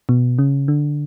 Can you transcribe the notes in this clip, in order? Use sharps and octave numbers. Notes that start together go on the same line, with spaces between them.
B2
C#3
D3